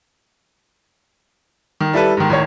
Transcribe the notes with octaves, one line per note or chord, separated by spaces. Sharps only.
D#3
G3 E4 A4 B4
G#2 D#3
A1 D#3 C#5